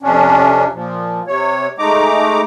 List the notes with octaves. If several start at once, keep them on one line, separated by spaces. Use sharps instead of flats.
F2 C3 C#4 D4
A#2 F3
C3 C#5
G#3 A3 D#4 A#5 D6